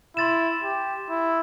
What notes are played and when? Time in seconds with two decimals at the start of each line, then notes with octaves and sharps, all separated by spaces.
0.16 E4 C6 A6 E7
0.63 G4
1.10 E4